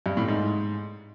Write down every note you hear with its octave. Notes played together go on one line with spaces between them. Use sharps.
G2
A2
G#2